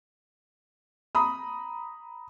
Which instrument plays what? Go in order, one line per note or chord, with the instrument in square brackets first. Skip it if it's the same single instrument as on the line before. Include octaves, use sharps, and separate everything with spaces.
[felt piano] A#5 B5 D#6